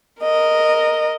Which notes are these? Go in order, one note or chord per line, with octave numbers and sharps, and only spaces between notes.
A#4 D#5